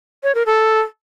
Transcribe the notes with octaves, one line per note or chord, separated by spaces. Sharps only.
C#5
A#4
A4